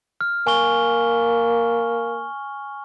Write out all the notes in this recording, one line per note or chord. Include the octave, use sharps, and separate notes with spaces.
F6
A#3 G#5 C#6 G7